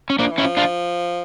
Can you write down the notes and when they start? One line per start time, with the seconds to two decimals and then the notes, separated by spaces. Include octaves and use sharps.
0.10 C#4
0.19 F3 A#3 D4
0.32 E3
0.38 C#4 E4
0.44 F3
0.57 D4 F4